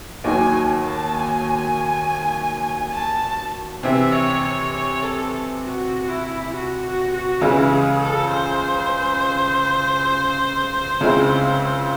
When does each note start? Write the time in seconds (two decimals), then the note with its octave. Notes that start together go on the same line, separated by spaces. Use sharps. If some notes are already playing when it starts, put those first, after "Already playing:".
0.24 D#2 D#3 F#3 G#5
0.85 A5
1.14 G#5
2.93 A5
3.83 C3 E3 C4 E5
4.12 C#5
4.43 C#5
4.72 C#5
5.03 A4
5.63 F#4
6.08 E4
6.53 F#4
6.82 F#4
7.12 F#4
7.41 C#2 C#3 E3 G#3 E4
7.71 G#4
8.01 A4
8.31 C5
11.00 C#2 C#3 G#3 C4 E4